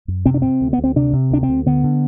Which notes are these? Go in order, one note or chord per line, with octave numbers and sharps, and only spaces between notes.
F#2
C3 C4
D4
C3 C4
D2
B3
D2
C4
C3 D4
C3
D2 D4
C4
D2
D3 B3
D3